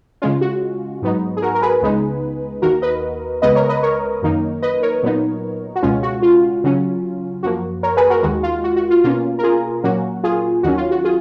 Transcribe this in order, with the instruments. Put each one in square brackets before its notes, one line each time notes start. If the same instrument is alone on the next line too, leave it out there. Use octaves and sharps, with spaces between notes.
[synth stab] C#3 G#3 C#4 F4
F#4
G#2 F#3 B3 D#4
G#4
F#4 A#4
A#4
G#4 B4
C#2 C#3 G#3 B3 D#4
D#2 D#3 A#3 F#4 A#4
B4 D#5
C#2 C#3 G#3 B3 B4 D#5
A#4 C#5
B4 D#5
A#4 C#5
F#2 D#3 A#3 D#4
B4 D#5
A#4 C#5
A#2 F#3 B3 D#4
F#4
C#2 B2 G#3 C#4 F4
F#4
F4
C#3 F#3 C#4
F#2 F3 A#3 F#4
A#4 C#5
G#4 B4
F#4 A#4
D#2 D#3 G#3 F#4
F4
F#4
F#4
F4
B2 A#3 C#4 F4
A#4
F4 G#4
A#2 F#3 A#3 C#4 F#4
F4 G#4
D#2 D#3 F#3 C#4 F#4
F4
F#4
F4 G#4